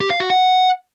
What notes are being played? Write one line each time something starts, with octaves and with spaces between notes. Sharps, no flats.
G4
F5
F#4
F#5